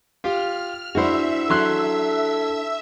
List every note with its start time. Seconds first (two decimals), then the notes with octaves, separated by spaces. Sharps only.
0.24 F4 G4 F6
0.95 D4 E4 F#4 G#4 C5 E5 E6
1.50 F#3 A4 C6 F#6